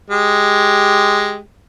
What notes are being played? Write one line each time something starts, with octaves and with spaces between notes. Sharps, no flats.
G#3 G4